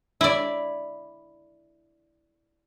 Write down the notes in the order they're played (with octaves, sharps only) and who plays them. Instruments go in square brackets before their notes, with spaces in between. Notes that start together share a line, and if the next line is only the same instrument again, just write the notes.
[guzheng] E4 D5